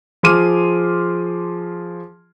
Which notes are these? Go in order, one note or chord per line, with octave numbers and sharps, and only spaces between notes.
F3 G#4 C6 D6 F6 D#7